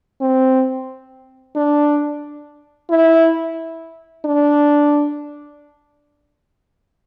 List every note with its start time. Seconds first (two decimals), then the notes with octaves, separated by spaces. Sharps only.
0.21 C4
1.56 D4
2.90 E4
4.25 D4